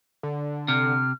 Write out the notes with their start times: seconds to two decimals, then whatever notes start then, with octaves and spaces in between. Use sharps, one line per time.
0.23 D3
0.68 C3 F6